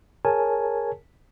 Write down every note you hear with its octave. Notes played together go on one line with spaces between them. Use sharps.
G#4 A#4 C#5 G#5 A5